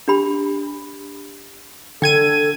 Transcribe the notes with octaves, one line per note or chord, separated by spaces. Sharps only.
D4 G4 B5
D3 A4 G5 G#6 D#7